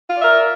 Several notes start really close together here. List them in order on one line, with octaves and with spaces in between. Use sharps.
F4 D5 E5 A#4